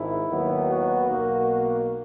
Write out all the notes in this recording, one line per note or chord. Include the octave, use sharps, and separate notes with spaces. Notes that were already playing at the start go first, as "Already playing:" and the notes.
Already playing: G#1 G#2 E4
D#2 D#3 F#3 B3
F#4
B1 B2 A#3